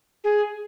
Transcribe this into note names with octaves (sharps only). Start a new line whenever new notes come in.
G#4